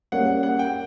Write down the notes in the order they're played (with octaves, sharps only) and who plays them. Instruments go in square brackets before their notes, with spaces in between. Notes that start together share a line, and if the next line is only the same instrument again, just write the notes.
[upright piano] G3 A#3 C#4 [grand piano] F#5
[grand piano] F#5
G5